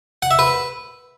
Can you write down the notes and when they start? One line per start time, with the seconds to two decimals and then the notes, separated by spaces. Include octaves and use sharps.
0.22 F#5
0.31 E5
0.39 B4